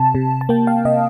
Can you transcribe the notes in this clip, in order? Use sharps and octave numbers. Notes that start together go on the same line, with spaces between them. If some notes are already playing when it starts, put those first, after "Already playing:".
Already playing: C3 A5
C3
A5
A#3 G5
F5
C3 D#5